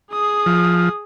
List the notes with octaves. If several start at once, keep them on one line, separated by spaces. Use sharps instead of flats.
G#4 D#6
F3